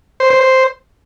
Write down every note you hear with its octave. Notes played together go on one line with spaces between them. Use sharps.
C5
C5
C5